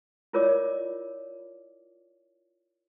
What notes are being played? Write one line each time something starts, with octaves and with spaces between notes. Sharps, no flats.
E4 F4 A#4 C#5 D5 D6